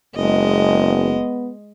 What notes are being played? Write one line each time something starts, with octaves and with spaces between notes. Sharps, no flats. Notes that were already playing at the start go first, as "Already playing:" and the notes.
F#1 G#3 B3 D#5
B3